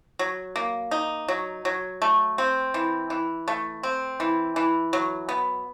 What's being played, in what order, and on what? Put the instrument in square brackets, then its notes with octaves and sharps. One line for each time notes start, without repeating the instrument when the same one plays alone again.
[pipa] F#3
A#3
D#4
F#3
F#3
A3
C4
E3
E3
A3
C4
E3
E3
F#3
B3